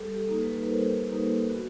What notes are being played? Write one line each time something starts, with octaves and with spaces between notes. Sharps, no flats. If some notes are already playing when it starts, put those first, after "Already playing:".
Already playing: G3 G4 A4
G4 A4
A#3 D#4
A4 B4
G3 A#4 C5
A#3 D#4 G4
B3 F#4